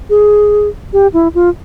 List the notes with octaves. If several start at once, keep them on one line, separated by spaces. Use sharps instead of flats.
G#4
G4
E4
F4